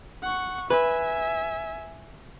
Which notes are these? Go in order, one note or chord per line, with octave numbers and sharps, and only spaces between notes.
F#5 C#6
B4 E5 G#5